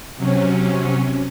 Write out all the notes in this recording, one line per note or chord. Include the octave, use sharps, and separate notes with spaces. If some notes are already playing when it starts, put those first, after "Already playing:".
C3 F#3 C#4